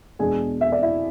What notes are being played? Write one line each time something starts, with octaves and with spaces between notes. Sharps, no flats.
E2 B2 G#3 D4 G#4 G#5
E5
D5
E4 E5